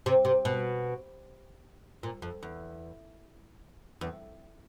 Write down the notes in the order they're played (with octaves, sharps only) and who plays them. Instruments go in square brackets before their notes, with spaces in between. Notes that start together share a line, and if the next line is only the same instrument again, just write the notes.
[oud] C3
C3
B2
A#2
F2
E2
E2